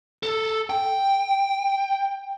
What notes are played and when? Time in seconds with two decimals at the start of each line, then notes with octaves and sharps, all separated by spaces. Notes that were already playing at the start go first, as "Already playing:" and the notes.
0.23 A4
0.70 G5